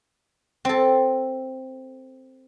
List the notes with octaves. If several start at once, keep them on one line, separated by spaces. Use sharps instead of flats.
C4 A4